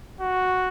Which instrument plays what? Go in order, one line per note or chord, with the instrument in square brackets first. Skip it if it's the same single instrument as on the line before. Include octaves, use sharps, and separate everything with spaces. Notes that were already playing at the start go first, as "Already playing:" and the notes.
[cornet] F#4